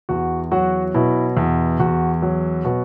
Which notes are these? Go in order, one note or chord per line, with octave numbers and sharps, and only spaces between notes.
E2 F#4
F#3 F#4
B2 E4
E2
E2 F#4
F#3
B2 F#4